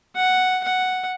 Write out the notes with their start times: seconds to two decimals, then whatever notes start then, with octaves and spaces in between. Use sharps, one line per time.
0.16 F#5
0.64 F#5